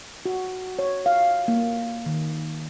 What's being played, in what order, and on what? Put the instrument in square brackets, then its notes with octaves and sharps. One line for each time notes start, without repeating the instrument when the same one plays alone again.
[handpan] F#4
C#5
F5
A#3
D#3